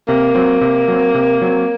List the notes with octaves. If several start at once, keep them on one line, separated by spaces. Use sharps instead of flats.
C3 A#3
F#3 C4
C3
F#3 C4
C3
F#3 C4